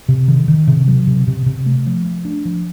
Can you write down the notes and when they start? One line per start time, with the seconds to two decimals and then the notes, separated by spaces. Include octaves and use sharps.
0.08 C3
0.28 D#3
0.48 D#3
0.67 C3
0.88 F#3
1.07 C3
1.27 C3
1.46 C3
1.66 A3
1.86 F3
2.05 A3
2.25 D4
2.45 F3